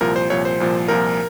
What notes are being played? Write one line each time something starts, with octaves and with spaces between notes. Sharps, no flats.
C2 A#2 F3 A#4
C5
C2 A#2 F3 C#5
C5
C2 A#2 F3
C2 A#2 F3 A#4